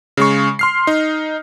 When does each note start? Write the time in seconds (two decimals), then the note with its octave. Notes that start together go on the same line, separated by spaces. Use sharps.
0.17 C#3 G#3 C#6
0.59 C6 F6 C7
0.87 D#4